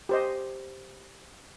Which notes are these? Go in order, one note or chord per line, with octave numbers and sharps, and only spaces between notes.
G4 C5 D#5